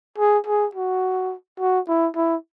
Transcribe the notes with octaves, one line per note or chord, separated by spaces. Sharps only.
G#4
G#4
F#4
F#4
E4
E4